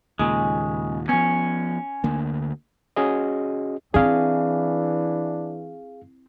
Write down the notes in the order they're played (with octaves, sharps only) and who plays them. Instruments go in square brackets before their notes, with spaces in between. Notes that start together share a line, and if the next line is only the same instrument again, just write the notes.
[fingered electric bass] D#2 A#2 [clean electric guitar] C#3 G#3
[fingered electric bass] F3 B3 [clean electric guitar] C#4
[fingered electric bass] D2 D3 A#3
[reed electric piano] C#4 F#4 G#4 D#5
[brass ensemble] E3 [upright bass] C4 E4 [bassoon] D4 [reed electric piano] G#4 F5